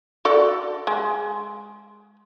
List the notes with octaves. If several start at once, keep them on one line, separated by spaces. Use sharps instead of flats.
F#4 A4 D5
G#3